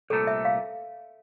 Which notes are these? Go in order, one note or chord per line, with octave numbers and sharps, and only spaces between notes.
C2 A#2 A3 A4
E5
F5